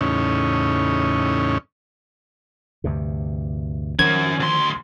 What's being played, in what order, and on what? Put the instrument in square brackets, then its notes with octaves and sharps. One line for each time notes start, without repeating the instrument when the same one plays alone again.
[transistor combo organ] E2 A2 C#3 C#4 D#4
[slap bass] D2 G2 C3
[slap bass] D#3 F3 [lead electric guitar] C#4 A#4 [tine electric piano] G#6
[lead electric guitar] D2 C6